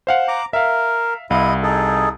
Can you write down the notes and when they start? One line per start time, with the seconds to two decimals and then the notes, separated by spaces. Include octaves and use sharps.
0.07 C5 F5 F#5
0.28 A#5 D6
0.53 A#4 E5 F5
1.30 C2 E4 D#5 F5 D#6
1.63 D#4 G#4 A4